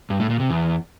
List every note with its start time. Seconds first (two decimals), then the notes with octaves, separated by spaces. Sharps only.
0.10 G2
0.20 A2
0.30 A#2
0.40 C3
0.50 E2